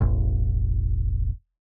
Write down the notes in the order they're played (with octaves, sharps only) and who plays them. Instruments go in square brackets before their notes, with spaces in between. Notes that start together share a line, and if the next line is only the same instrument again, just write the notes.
[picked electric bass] E1 A1